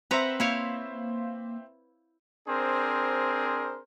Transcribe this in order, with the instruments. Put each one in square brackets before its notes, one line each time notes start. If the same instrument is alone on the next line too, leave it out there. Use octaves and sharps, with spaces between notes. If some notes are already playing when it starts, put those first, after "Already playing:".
[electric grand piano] C4 C5 E5 [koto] B4 F#5 A#5
[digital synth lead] A#3 [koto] E4 C#5 F5
[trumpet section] C4 D4 G#4 A#4 C5